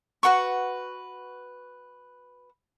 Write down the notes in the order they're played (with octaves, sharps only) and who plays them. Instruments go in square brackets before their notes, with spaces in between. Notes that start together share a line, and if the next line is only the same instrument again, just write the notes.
[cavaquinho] F#4 B4 F#5 C#6